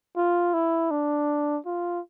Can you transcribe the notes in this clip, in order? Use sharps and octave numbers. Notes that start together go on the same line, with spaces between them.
F4
E4
D4
F4